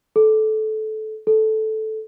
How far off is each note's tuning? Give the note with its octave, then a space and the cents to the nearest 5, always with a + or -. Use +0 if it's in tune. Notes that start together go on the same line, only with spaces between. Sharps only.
A4 -20
A4 -10